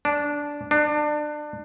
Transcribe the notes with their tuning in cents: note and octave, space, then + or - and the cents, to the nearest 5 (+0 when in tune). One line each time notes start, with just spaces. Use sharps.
D4 -10
D4 +25